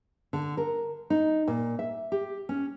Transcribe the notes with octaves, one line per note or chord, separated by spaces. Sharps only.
D3
A#4
D#4
A#2
E5
G4
C#4